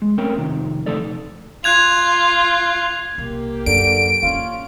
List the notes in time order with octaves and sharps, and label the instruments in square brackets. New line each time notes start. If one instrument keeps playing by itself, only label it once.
[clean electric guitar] G#3
A3 C4 C#4 A#4 G5
F2 C3 D#3
C3 F3 A3 D#4 A4 D5
[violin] F4 [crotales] F#6 G#6 F7
[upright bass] C2 [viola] A#3 G4
[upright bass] F#2 [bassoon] D3 [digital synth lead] D7
[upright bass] A#3 E4 [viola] C#4 [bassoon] F4